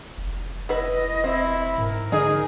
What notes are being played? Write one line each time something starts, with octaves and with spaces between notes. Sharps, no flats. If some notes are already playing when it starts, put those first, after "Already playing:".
F1
E4 B4 D#5
C4 E4
G#2 A#4
D3 D#4 G#4